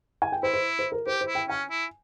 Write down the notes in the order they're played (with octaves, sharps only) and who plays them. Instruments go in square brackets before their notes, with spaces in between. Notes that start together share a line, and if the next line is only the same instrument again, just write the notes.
[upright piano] G#5
G5
[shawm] E4 [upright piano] C5
[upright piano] C5
C5
A#4
[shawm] G4 [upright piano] C5
[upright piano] C5
[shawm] E4
[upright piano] G5
[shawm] C#4 [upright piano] G#5
[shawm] E4